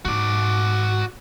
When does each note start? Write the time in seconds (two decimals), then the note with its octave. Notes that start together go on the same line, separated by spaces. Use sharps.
0.05 G#2 F#4 D5